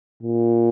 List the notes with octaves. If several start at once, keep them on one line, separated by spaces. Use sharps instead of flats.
A#2